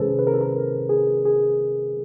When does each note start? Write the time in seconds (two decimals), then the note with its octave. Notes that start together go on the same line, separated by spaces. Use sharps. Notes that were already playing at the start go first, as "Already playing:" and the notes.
Already playing: C3 D#3 G#3 C#4 G#4 A4 B4 C5
0.19 B4
0.27 A#4
0.34 A4
0.41 A#4
0.89 G#4
1.25 G#4